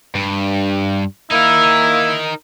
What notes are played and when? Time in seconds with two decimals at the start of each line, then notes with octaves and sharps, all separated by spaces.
0.15 G2
1.31 A#3 D#4 E4 A#4